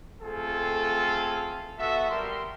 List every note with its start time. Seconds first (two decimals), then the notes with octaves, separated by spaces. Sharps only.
0.22 A3 C4 F4 G#4 A4
1.79 B3 F#4 A4 E5
2.10 G3 A#4 C6